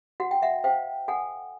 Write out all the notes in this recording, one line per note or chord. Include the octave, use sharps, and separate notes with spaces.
F#4 F#5
G5
E5 F#5
C5 F5 G5
A4 F#5 G#5